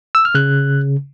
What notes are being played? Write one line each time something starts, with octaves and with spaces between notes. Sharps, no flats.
E6
F6
C#3 F#6